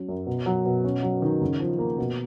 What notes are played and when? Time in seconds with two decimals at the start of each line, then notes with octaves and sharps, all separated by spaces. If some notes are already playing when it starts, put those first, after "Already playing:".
Already playing: F#3 C#4
0.09 F#2
0.27 B2
0.46 F#3
0.66 B2
0.84 C#4
1.03 F#3
1.22 D#3
1.41 C#3
1.60 F3
1.79 A#3
1.98 B2